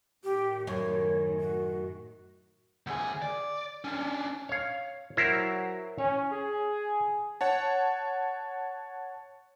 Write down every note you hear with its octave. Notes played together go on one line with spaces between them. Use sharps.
A2 D#3 G4
F#2 C#5
F#4
D2 G#4
D5
C#4 D4
C#5 F5
F#3 E4 A#4 C5
C#4 C#5
G#4
C#5 F#5 A5